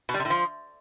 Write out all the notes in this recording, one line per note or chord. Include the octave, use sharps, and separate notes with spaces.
B2
G3
C3
A2
F3